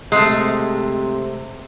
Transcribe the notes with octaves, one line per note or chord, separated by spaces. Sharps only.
C3 G#3 A3